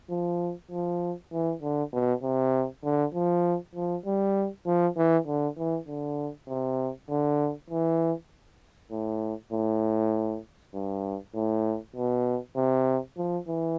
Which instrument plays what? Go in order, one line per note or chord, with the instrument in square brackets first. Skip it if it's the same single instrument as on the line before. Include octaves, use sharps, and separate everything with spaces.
[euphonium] F3
F3
E3
D3
B2
C3
D3
F3
F3
G3
F3
E3
D3
E3
D3
C3
D3
E3
A2
A2
G2
A2
B2
C3
F3
E3